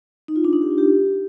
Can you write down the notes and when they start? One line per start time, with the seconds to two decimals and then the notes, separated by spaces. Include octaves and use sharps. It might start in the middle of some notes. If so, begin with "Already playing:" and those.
0.28 D#4
0.36 F4
0.45 D4
0.53 D#4
0.62 G4
0.70 F4
0.78 G4